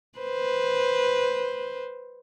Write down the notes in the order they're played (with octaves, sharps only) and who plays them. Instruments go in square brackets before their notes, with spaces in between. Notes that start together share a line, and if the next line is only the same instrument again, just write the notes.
[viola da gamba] B4 C5